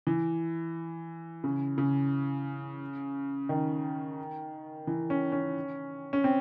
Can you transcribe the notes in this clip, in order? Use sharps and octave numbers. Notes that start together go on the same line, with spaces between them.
E3
C#3
C#3
D#3
E3
C#4
C#4
C#4
C4